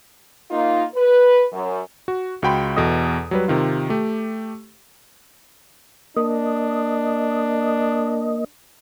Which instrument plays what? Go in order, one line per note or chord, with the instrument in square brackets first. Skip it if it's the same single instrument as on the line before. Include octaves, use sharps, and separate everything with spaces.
[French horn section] A#3 D#4 F4
B4
F#2
[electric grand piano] F#4
C#2 F#4 G5 B5 C6
E2 B2 A4 D#5 D#6
F#3 G3 B4
C3 D#3 F4
A3 G4
[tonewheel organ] A#3 D#5 [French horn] D4